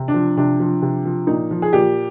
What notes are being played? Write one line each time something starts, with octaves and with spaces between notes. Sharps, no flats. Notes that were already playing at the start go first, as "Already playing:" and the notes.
Already playing: C3
D4
F3
C3 D4
F3
C3
F3
A#2 D#4
F3
G#4
A#2 G4